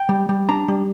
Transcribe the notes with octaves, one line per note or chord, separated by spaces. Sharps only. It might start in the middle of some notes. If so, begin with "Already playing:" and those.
Already playing: G5
G3
G3
D4 A#5
G3